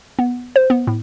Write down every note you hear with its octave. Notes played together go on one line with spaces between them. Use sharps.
B3
C5
B3
A2